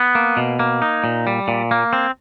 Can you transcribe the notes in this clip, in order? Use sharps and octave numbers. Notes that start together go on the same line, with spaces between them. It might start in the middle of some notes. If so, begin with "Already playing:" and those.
Already playing: B3
A#3
B2
A#3
D#4
A#2
G3
A#2
A#3
C4